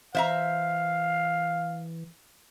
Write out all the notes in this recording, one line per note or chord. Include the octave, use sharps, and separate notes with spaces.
E3 C5 E5 F5 A#5